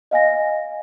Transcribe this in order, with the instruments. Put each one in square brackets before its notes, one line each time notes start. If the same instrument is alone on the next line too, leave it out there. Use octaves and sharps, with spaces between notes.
[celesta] D#5 F5 G#5 A#6